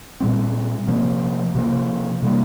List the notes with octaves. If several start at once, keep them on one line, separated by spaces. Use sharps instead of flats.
A#2 G3 C4
C3 F3 A#3
C3 F3 A#3
C3 G3 A#3